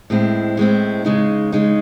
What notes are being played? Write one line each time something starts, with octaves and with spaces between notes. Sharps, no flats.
A2 G#3 C4 E4
A2 G#3 C4 E4
C#3 G#3 D#4
C#3 G#3 D#4